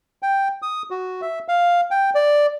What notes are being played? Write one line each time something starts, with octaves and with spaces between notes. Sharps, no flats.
G5
D#6
F#4
E5
F5
G5
D5